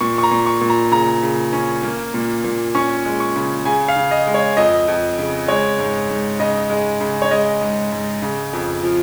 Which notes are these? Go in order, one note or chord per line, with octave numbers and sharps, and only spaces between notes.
A#2 C#6
C#6
A#5
A#2
C#6
A#2
A#5
C#3 A#5
C#3
C#4
A#3
A#2
A#2
C#4 C#6
G#3
C#6
C#3
C#3 G#5
F5
C#3
D#5
G#3
C#5
F2 D#5
F2
C#3
G#3 C#5
G#2
G#2
C#3 D#5
G#3
C#3
C#5
G#3 D#5
G#2
G#2
C#3
F2
F3